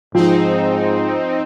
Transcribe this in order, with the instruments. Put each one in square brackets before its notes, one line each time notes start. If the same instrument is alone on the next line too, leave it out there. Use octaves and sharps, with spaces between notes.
[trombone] G#2 [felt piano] F3 [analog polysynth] C4 D#4